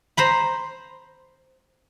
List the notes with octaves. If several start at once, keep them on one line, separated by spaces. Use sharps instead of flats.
C5 A#5 B5